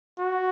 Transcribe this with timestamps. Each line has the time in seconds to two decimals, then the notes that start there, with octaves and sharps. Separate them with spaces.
0.19 F#4